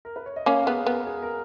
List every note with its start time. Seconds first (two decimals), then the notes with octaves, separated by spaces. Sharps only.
0.05 A#4
0.16 B4
0.26 C#5
0.36 D#5
0.46 A#3 C#4 C#5 F5
0.62 A#4
0.67 B3 G#4 B4
0.87 B3 A#4
1.07 G#4
1.22 A#4